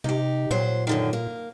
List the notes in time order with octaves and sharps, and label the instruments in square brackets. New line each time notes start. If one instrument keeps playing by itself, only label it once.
[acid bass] C3 [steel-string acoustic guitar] D#4 G4
[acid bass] A#2 [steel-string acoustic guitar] F#3 C5
[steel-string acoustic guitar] F#2 D3 D#3
A#3